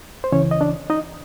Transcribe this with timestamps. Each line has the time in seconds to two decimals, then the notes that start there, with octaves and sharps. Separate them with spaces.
0.24 C5
0.32 C#2 C#3 E3 C#4 C#5
0.51 D#5
0.61 D4 D5
0.90 D#4 D#5